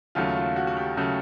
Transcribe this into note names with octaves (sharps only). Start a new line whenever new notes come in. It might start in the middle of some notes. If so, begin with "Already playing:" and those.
D#2 C#3 F#3 A3 F4
F4
F#4
F#4
G4
C#3 F#3 A3